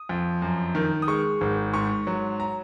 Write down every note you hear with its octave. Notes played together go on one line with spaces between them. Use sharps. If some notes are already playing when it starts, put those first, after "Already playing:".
Already playing: D#6
F2
F#2
D#3
D#6
G#3 C#6
G#1
G#2 C#6
F#3
A#5